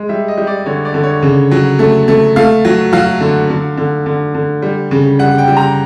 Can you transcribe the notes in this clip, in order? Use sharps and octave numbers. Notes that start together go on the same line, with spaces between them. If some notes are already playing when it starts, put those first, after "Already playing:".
Already playing: G#3
G3 E5
D#5
G3
D5
D3 C#5
D5
D3
C#5
C#3
F#3
A3
A3
A3 F5
F#3
F#3 F5
D3
D3
D3
D3
D3
G3
C#3
G3 F#5
G5
G3
A#5